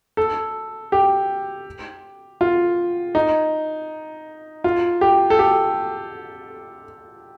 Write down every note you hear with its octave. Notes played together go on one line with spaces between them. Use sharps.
A4
G4
F4
D#4
F4
G4
A4
G4